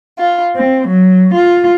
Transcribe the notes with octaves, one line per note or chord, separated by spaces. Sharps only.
F4
C4
F#3
F4